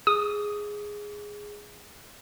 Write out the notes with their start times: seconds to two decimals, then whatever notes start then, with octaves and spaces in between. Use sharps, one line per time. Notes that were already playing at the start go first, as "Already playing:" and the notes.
0.07 G#4 D#6